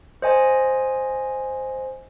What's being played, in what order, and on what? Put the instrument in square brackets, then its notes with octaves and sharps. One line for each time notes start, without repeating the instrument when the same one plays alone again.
[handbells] C5 D#5 G#5